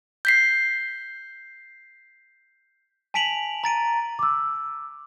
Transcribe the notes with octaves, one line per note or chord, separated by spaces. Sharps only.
G6 B6 C7
G#5 A5 B6 D7 F7 F#7
A#5 A6 D7 D#7
D6 E6